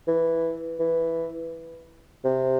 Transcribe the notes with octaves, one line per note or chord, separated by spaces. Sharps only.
E3
E3
C3